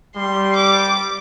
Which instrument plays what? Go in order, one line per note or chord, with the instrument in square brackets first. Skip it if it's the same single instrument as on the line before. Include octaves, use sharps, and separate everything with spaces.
[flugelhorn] G3 [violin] C6
[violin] D6